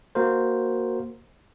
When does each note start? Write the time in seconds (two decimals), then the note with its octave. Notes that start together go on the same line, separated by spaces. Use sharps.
0.15 A#3 F#4 A#4 C5